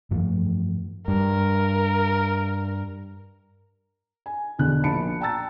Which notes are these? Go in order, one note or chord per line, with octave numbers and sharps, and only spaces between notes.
G2 E3 F3 A3
G2 A#4
G#5
E2 B2 D3 F#6
A#1 A5 B5 C#7 D7
G5 A5 A#5 E6 A6